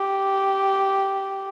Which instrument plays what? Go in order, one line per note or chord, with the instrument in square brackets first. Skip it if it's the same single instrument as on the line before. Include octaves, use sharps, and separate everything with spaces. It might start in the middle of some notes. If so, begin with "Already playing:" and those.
Already playing: [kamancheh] G4